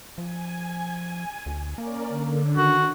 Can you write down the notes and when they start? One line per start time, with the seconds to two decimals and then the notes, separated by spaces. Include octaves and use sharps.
0.18 F3 G#5
1.46 D2
1.78 A#3 C#4 A#4 D5
2.08 D3
2.57 D#3 F#4